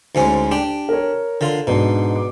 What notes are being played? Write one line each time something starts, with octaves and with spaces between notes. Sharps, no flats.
D2 G#2 C#4
D4 G4
A#4 C#5
D3 F4
G#2 B2 D4
D6